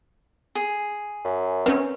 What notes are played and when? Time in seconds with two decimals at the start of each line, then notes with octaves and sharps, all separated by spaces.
0.55 G#4
1.25 F#2
1.66 C4 C#4 B4